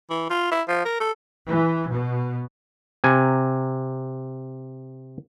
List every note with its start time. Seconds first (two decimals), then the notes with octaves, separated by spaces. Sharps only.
0.10 E3
0.30 F4
0.52 E4
0.68 F3
0.85 A#4
1.00 A4
1.46 E3
1.90 B2
3.04 C3 G#5